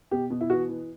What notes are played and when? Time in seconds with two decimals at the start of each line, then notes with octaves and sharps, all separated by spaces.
0.11 B2 G4
0.30 B2
0.41 E4
0.49 E3 F#4
0.68 E3